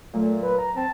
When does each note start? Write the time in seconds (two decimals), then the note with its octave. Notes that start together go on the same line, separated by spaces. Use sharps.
0.14 A#2 F#3 A3
0.42 B4
0.59 A#5
0.76 C4 A5